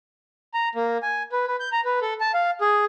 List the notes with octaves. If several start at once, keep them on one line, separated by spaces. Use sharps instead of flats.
A#5
A#3
G#5
B4
B4
G6
A#5
B4
A4
A5
F5
G#4